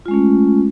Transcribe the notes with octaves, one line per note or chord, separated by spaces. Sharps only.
G#3 A3 C#4 F4